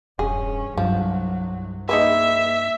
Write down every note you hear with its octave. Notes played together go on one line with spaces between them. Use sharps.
E1 G2 C#4 G#4
C2 G2 F3 F#3
A#3 D#4 G#4 B4 E5